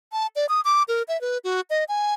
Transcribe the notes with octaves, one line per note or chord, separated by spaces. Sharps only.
A5
D5
D#6
D6
A#4
E5
B4
F#4
D#5
G#5